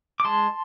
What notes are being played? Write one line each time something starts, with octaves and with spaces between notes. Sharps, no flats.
D6
G#3 A5 C6